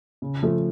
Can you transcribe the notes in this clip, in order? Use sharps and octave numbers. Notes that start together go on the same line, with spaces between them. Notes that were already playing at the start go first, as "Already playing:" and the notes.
C#3
F3 A3